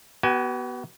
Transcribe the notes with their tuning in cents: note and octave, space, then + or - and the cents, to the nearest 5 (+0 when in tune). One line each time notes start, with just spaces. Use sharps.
B3 -10 F#4 +45 G#5 +0